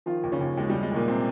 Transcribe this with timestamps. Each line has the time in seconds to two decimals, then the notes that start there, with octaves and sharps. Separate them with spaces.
0.06 D#3 F3 F4
0.23 D#2
0.32 C#3 C#4
0.40 D#2
0.57 D#2 G#3
0.69 D#2 G3
0.82 G#3
0.91 D#2 A#2 A#3
1.08 C3 C4